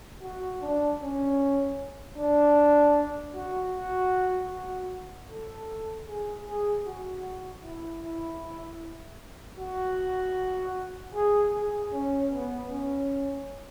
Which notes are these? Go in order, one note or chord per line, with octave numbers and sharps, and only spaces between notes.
F#4
D4
C#4
D4
F#4
F#4
F#4
A4
G#4
G#4
F#4
E4
E4
F#4
G#4
G#4
C#4
B3
C#4